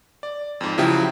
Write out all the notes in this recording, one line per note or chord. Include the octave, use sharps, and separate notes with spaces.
D5
F2 G#2
C#3 F3 F#3 E4 G4